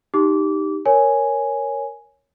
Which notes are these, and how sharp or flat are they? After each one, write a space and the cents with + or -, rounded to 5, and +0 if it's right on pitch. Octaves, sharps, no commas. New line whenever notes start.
D#4 +0 G4 +0 D6 -25
A#4 +0 C#5 +0 G#5 +0